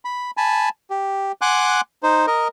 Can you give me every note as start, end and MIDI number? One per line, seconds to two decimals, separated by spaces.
0.05 0.31 83
0.37 0.69 80
0.37 0.69 81
0.37 0.69 83
0.90 1.32 67
1.41 1.81 78
1.41 1.81 80
1.41 1.81 84
1.41 1.81 86
1.41 1.81 90
2.03 2.26 63
2.03 2.26 72
2.27 2.48 70
2.27 2.48 75